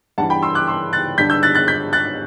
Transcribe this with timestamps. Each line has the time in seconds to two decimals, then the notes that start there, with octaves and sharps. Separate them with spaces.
0.18 G2 E3 F#5 A5
0.30 G5 B5
0.42 C6 E6
0.55 D6 F#6
0.67 C6 E6
0.93 F#6 A6
1.18 G2 D3 G6 B6
1.30 E6 G6
1.43 F#6 A6
1.55 F#6 A6
1.68 G6 B6
1.93 F#6 A6